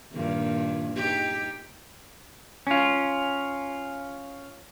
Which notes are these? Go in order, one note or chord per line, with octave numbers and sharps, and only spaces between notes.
G2 A#2 D#3
D#4 G4
C#4 F4